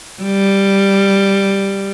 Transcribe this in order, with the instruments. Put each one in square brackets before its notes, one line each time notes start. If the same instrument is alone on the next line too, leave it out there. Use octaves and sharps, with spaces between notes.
[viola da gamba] G3